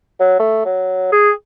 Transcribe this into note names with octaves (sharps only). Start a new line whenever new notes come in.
F#3
A3
F#3
G#4